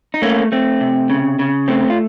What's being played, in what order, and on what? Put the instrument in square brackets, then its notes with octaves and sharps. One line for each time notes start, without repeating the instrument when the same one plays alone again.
[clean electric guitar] D#4
A3 A#3 C#4
A3 C4
C3
C#3
C#3
A3 C4
F4